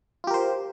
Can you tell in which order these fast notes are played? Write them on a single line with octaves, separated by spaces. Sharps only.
F4 G4 A#4 C5